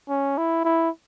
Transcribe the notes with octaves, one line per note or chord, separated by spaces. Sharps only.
C#4
E4
E4